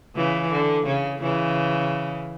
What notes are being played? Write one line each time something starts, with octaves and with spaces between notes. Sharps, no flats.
C#3 E3
D3
C#3
C#3 E3